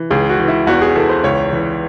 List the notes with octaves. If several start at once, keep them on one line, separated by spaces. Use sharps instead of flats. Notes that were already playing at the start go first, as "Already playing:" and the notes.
Already playing: E3
C#2 G#4
F#4
E3
E4
E2 F#4
G#4
E3 A4
C5
C#2 C#5
E3